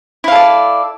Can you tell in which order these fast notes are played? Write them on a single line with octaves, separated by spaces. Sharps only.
E4 F5 A4 D5